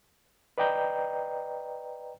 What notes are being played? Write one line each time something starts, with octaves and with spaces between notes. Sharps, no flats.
B4 D5 D#5 G5 A#5 G6